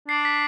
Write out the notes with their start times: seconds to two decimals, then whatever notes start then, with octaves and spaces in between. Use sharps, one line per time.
0.08 D4 C7
0.25 B6